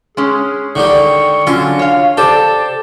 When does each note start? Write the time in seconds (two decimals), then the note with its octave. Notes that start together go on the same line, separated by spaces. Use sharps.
0.17 G#3 C#4 G#4
0.76 D3 D#3 G3 C#6
1.47 D3 F#3 C#4 F4
1.79 C#5 F5
2.17 G4 A4 C5 D5 A5